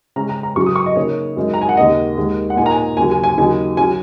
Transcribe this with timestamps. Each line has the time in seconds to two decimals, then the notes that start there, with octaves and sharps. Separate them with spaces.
0.16 C#3 G#3 C#4 A#5
0.29 A#5
0.43 A#5
0.56 F#2 C#3 F#3 C#6
0.66 D#6
0.76 C#6
0.86 D#5
0.96 C#3 A#3 D#4 C#5
1.37 F#2 D#3 G#3 D#4
1.54 A#5
1.61 G#5
1.69 F#5
1.77 D#2 C#3 A#3 D#4 D#5
2.17 D#2 D#3 G#3 D#4
2.50 F#5
2.56 A#2 A#3 D#4 G#5
2.66 A#5
2.71 G#5
2.97 D#2 C#3 F#3 G#5
3.11 G#5
3.24 G#5
3.37 D#2 C#3 F#3 D#4 G#5
3.77 F#3 C#4 G#5